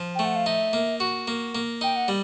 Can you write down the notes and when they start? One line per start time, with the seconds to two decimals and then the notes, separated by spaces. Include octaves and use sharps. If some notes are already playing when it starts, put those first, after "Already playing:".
Already playing: F3
0.15 A3 G5
0.25 F#5
0.36 F5
0.46 D#4 E5
0.73 A#3
1.00 F#4
1.28 A#3
1.55 A#3
1.81 D#4 G5
1.96 F#5
2.08 G3